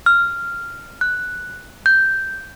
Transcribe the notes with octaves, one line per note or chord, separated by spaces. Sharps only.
F6
F#6
G6